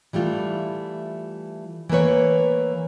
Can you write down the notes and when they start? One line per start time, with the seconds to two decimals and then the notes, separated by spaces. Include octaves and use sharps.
0.13 E3 G3 A3 F4
1.89 E3 A3 A#3 B4 C#5